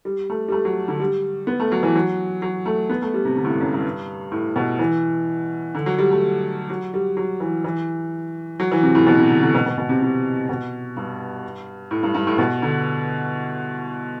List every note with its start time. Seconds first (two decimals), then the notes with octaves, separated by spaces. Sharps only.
0.05 G3
0.30 A3
0.48 G3
0.52 A3
0.65 F#3
0.88 D3
1.00 G3
1.47 B3
1.60 A3
1.72 F#3
1.83 E3
1.95 F#3
2.42 F#3
2.66 A3
2.90 B3
3.02 A3
3.14 G3
3.25 C3
3.37 D3
3.45 A2
3.49 G2
3.60 F#2
3.73 G2
4.32 A2
4.56 B2
4.79 E3
5.75 D3
5.86 F#3
5.98 G3
6.11 A3
6.70 F#3
6.94 G3
7.17 F#3
7.40 E3
7.64 E3
8.60 F#3
8.72 E3
8.83 C3
8.95 A2
9.07 B2
9.19 C3
9.30 D3
9.42 D3
9.55 B2
9.66 B2
9.78 B2
9.89 C3
10.02 C3
10.49 B2
10.97 G2
11.91 A2
12.03 G2
12.15 G2
12.27 A2
12.38 B2
12.62 D3